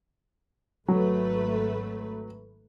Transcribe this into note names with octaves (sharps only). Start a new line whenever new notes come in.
G#1 F#3 A3 B4